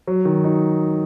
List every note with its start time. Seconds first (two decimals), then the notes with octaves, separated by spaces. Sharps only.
0.07 F#3
0.25 D#3
0.44 D#4